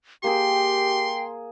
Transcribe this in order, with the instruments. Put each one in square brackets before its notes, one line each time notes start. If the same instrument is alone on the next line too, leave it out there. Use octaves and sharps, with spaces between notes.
[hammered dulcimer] A#3 G#4 [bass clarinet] G4 [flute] G5 [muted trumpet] C6